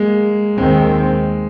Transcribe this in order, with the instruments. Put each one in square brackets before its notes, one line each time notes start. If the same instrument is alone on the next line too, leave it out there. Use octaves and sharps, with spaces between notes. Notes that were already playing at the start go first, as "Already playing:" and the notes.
Already playing: [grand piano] G#3 A#3
[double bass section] D#2 D#3 C4 [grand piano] G#3